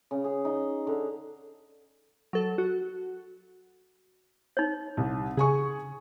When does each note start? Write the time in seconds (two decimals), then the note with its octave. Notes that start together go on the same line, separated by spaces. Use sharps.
0.11 C#3
0.24 G#4
0.45 D#4
0.87 D3
2.33 F#3 A4
2.58 F#4
4.57 D#4 C#5
4.97 C2
5.37 C#3 G#4 G#5 C#6